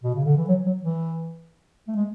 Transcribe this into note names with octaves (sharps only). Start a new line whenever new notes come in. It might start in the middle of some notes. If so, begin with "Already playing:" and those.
B2
C#3
D3
E3
F#3
F#3
E3
A3
G#3